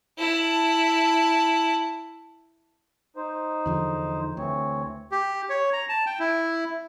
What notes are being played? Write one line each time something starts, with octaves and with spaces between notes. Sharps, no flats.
E4 A5
D#4 C5
E2 D3 F3
D2 E3 C4 C#5
G4
C#5
A#5
A5
G5
E4